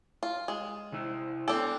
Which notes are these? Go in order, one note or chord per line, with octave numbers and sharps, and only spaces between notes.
F4
G#3
C3 E4
B3 D4 A4 G5